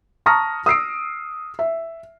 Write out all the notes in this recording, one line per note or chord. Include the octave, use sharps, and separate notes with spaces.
A5 A#5 C#6 D#6 F6 A#6
D#6 E6 C7 D7
E5